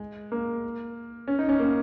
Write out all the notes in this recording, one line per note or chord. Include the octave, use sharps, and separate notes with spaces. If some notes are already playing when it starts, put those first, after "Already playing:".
Already playing: G#3
A#3
C#4
D#4
C#4
A#3